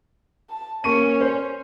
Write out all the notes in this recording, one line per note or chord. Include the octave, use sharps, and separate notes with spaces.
A5
A#3 C#4 C#6 D#7
C5